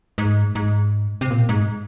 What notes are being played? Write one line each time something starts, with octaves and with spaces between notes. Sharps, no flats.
G#2
G#2
C3
A#2
G#2